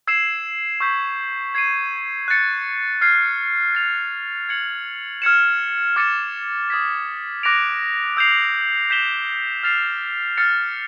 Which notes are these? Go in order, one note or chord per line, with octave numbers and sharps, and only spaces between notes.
E6 G#6 C7 E7
C#6 E6 G6 B6
G#6 C7 D#7
F#6 A6 C#7
F6 G#6 C7
A6 C7 F7
G#6 C#7 F#7
F6 G#6 C#7 E7
D6 F6 A6 C#7 E7
D#6 G#6 B6
D6 F#6 A#6 D7 F7
E6 G6 C7 F7
G6 B6 E7 G7
F6 A6 C7 F7
F6 A6 C#7